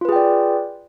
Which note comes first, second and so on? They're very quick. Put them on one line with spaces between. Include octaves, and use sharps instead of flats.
F4 B4 G#4 G5 D5